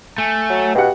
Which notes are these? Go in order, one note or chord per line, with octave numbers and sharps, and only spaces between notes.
A3 G#5
F#3
B2 G4 F5 F#5